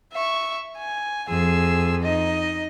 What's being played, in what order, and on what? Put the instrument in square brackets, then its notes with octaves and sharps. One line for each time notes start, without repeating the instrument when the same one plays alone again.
[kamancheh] E5 C#6
G#5
[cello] F2 [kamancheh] G#4 E6
[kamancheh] D#4 D#5